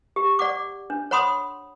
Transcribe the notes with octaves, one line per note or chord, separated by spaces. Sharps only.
G4
D5 F#5 D6
D4
C#5 F#5 B5 C6 D#6